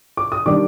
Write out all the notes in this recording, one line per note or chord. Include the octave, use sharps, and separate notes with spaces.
D6
D#6
D#3 G3 D4 D6